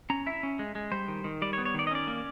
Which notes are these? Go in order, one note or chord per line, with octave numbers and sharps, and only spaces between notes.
C#4 A#5
E4 E5
C#4
G#3
G#3
G3 C5
D#3
D#3
G3 D5
C#5
B3
C#5
D#3 D5
D#5
C#4 D5
A#3